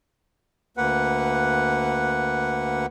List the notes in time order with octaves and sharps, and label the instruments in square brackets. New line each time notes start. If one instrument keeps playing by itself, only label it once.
[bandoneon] D2 A#3 B4 F#5